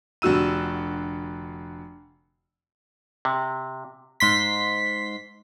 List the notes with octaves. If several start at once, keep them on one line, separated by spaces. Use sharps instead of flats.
F1 D3 F#4 E6 D#7
C3
G#2 C6 B6